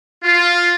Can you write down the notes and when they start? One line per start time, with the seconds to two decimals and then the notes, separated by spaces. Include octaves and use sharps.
0.24 F4